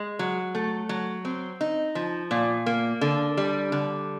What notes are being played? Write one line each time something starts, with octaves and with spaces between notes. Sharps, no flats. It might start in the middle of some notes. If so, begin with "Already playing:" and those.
Already playing: G#3
F#3
A3
F#3
C4
D#4
F3
A#2
A#3
D3
G3
D3